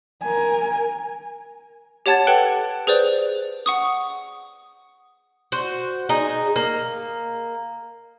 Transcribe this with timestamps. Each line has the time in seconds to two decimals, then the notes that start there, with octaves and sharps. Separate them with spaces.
0.22 A#4 G#5
2.06 G4 C#5 F#5 A5 G#6 A6
2.27 A4 B4 F#5 G5 F#6
2.87 G#4 B4 C5 D5
3.66 F#5 C#6 D#6
5.52 F#4 C5
6.09 D#4 G#4
6.56 A#3